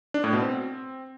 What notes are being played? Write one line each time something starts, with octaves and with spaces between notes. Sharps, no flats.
D4
A2
B2
C4